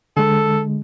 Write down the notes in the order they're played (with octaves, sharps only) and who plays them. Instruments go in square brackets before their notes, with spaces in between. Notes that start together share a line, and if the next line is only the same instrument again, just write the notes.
[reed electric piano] D3 G#3 [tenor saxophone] A4